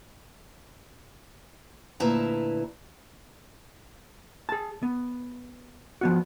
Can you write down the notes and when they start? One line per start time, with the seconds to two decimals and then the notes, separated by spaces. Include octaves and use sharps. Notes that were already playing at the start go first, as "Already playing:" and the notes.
2.00 D2 A#2 E4 B4 A5 A#5
4.49 G#4 A5
4.83 B3
6.01 F3 B3 F#4